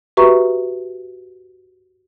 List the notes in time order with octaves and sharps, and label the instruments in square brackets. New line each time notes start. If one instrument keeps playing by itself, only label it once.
[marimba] F#4 G4 B4 E5 A#5 C#6